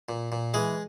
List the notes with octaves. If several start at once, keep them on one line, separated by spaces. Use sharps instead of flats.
A#2
A#2
E3 G#3 G#4